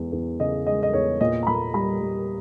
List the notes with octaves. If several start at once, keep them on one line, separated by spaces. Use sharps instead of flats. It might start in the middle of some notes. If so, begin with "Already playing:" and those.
Already playing: E2 G#3
E2
C#3 D#5
G#3 D#5
D#5
E2 C#5
A#2 D#5
A#5
A#2 B5
G3 B5
G3